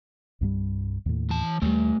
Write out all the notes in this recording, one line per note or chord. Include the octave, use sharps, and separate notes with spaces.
C2 G2 G3
D#2 A2
E3 A5
D#2 G3 A3 G4